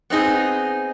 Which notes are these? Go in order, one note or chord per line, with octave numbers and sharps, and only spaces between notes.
B3 C4 D#4 G#4